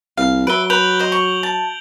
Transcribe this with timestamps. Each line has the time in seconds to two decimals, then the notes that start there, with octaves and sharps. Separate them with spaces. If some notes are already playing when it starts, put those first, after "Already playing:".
0.17 C2 F5
0.47 F#3 B4 E5 D7 G7
0.70 B4 G6 F7 F#7
0.99 C5 D#5
1.12 C#6
1.43 A5